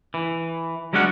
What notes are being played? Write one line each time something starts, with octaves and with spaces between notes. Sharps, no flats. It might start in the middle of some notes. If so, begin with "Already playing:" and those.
E3
F#3 G#3 C#4 D4 F#5